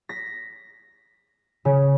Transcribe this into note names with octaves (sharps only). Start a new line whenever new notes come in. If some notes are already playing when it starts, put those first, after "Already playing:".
A#6 B6
C#3